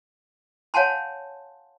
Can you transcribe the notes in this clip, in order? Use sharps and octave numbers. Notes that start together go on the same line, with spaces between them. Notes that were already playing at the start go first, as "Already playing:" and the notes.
C#5 F5 F#5 G#5 A5 C6